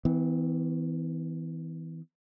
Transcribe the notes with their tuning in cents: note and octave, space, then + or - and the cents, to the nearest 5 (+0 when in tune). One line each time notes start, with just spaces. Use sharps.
E3 -25 B3 +40